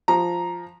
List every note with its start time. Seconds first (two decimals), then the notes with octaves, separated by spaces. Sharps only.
0.08 F3 A#5